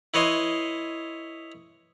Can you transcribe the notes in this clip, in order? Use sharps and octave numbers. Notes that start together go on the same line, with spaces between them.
E4 B4 C#5 D#5 C6